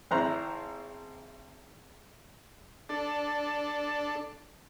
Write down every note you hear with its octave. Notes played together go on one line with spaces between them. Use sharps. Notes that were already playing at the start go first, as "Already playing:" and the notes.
G#1 C4 E4 C5 A#5 F#6
D4 A4